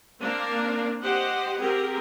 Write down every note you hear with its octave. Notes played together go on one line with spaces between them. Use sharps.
A#3 C4 D4 A#4 F5
G4 C5 D#5 F#5
C4 G4 G#4 A#4